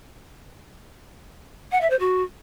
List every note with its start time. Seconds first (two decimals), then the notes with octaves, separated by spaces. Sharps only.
1.72 F#5
1.81 E5
1.90 C5
1.99 F#4